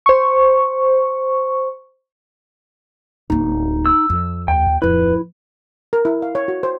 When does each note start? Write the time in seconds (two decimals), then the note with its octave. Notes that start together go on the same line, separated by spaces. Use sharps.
0.06 C5 C#6
3.30 D1 A#3 D#4
3.86 E6
4.10 F2
4.48 D#2 G5
4.67 D#2
4.82 D1 F2 E4 B4
5.93 A#4
6.05 E4
6.22 F5
6.35 C#5
6.48 F#4
6.63 C5